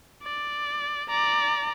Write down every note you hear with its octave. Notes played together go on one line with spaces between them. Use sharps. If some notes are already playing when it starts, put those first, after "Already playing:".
D5
D5 A#5